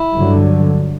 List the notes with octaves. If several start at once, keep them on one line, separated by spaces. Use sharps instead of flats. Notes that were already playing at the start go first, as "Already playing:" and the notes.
Already playing: E4
G2 D3 F#3